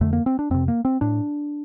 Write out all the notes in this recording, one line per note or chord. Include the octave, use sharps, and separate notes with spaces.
F2 D3 A3
A#3
C4
D4
F2 C3 C4
A#3
C4
A2 D4